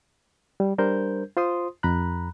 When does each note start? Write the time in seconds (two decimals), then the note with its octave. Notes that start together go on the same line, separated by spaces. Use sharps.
0.60 G3
0.78 G3 D4 A#4 C5 G6
1.37 F4 C5 C6 D#6
1.83 F2 A#5 B5 F#6